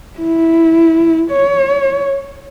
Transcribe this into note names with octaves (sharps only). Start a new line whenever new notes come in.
E4
C#5